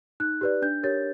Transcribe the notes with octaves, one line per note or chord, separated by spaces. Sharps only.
D#4 F#6
G4 B4 D5
D4 G6
G4 A#4 C#5 A6